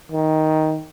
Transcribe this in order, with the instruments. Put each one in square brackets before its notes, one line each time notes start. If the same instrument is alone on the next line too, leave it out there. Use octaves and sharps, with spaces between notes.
[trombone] D#3